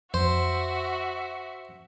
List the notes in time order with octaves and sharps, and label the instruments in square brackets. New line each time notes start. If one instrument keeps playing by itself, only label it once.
[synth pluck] F2 [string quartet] F#4 E5 [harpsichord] C5